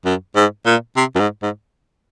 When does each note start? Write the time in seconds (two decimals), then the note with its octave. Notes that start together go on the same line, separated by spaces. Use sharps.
0.05 F#2
0.36 G#2
0.66 A#2
0.97 C3
1.15 F#2
1.20 G#2
1.43 G#2